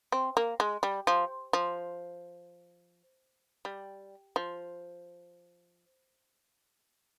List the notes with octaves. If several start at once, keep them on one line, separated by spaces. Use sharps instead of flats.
C4
A#3
G#3
G3
F3
F3
G3
F3